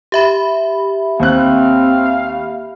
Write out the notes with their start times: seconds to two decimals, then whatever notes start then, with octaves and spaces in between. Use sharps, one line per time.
0.12 G4 E5 B5
1.20 D#2 C4 C5 F5 F#6